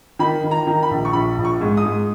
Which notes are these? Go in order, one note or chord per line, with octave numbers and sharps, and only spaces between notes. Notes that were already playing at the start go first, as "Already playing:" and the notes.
D#3 B5
D#3
A#5
D#3
B5
A#1
C#6
A#1 B5
A#1
C#6
G#2
D#6
G#2